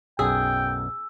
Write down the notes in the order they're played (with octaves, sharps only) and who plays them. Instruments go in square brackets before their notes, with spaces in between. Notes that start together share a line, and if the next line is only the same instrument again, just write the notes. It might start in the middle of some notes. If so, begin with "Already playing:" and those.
[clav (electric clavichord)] B1 F#2 [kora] G#4 [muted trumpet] G5 [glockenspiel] E6